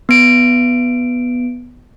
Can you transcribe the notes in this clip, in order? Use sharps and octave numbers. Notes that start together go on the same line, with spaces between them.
B3 D7